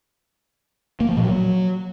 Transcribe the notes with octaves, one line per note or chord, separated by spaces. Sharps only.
A#3
F3
A#2
F#3